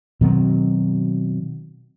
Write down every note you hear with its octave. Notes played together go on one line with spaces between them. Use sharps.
B2 D#3 F#3 C4